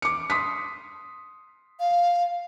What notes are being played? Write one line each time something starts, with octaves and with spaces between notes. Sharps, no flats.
D6 C#7
C6 D#6 B6
F5